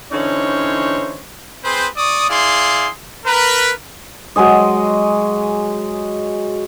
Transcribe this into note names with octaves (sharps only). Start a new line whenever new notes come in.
D3 E3 C#4 D#4 C5 C#5
C4 G#4 B4 C5
D5 C#6 D#6
E4 G#4 D5 F5 C6
A#4 B4
F#3 G#3 G#4 D#5